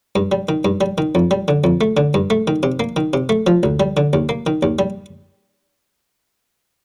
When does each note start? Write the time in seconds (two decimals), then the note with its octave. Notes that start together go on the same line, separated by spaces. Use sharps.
0.16 G2
0.32 G3
0.49 D#3
0.65 G2
0.81 G3
0.98 D#3
1.15 F2
1.31 G3
1.48 D3
1.64 F2
1.81 A3
1.97 D3
2.14 G2
2.30 A3
2.47 D#3
2.63 C3
2.80 A#3
2.96 D#3
3.13 C3
3.29 A3
3.47 F3
3.63 D2
3.80 G3
3.97 D3
4.13 D#2
4.29 A#3
4.46 D#3
4.63 D#2
4.79 G3